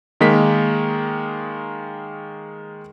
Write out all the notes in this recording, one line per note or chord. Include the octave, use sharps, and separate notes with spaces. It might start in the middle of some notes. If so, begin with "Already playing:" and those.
D#3 G#3 A#3 B6